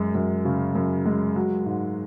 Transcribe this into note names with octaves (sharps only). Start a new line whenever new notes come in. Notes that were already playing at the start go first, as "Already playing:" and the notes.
Already playing: F#2 G#3
F#2
C#3
F#2
G#3
F#3
G#2